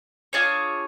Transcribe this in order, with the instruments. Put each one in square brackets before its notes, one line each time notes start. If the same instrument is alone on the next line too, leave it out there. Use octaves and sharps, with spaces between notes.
[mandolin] D4 F4 G#4 C#5